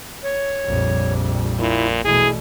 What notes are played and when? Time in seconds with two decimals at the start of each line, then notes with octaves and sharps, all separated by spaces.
0.23 C#5
0.66 A#1 F2 G3
1.59 A#2 E4
2.05 E2 B2 A3 E4 G#4